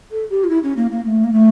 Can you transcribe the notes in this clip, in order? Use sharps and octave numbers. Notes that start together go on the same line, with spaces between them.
A4
G4
F4
E4
C#4
A#3
A#3
A3
A#3
A3